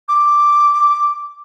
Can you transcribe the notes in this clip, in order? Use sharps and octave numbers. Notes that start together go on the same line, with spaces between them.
D6